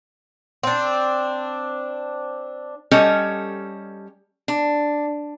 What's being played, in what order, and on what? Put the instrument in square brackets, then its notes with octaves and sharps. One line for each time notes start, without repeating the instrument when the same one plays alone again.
[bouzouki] C4 D4
[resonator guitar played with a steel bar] G3 C#4 G4 A4 C#5 D#5
D4